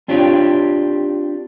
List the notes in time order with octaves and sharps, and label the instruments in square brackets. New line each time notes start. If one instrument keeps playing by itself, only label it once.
[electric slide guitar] C4 D4 F4 G4 C#5 G5